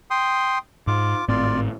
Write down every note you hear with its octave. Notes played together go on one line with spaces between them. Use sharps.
G5 C6 D#6
G#2 F4 D6
G#1 A2 C4 F4 D5